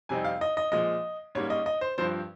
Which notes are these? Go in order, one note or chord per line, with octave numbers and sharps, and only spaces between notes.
F2 C3 G3 C4 D#4 G#5
F5
D#5
D#5
A#2 F3 G#3 D#5
G#2 G3 A#3 C#4 C#5
D#5
D#5
C5
G2 F3 C4 C5